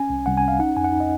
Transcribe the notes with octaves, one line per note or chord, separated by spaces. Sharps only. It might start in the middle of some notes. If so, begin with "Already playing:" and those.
Already playing: C#4 G#5
C2
C2 F#5
G#5
C#4
F5
D#4 F#5
F2 G#5
F#5
D#4
D#5